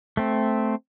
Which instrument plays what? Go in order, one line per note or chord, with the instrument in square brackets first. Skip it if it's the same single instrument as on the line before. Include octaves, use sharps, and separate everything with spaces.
[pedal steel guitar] A3 C4